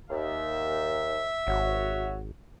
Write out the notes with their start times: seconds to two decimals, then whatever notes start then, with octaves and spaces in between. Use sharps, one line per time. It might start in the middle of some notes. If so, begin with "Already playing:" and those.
0.10 D#2 E5
1.47 G#1 F#4 C#5